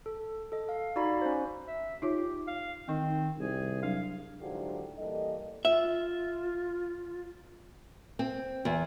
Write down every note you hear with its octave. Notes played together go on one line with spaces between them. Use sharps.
A4
A4 D#5
F5
D#4 F#4 D5 F5 A#5 B5
C#4 C5
E5
D#4 F4 G4 C#5
F5
D#3 C4 D#4 D#5
C2 G#4
F#3 D4 F5
G#2 D3 F#3 E4 F4 G4
E3 G3 A#3 A4 D#5
F4 E5
C4
E2